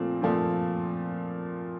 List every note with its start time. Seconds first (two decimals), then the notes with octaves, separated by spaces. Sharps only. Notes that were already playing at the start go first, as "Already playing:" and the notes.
Already playing: A#2 F3 A3 C4
0.22 A#2 F3 A3 C4